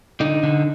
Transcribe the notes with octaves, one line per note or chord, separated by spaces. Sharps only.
D3 D#4
D3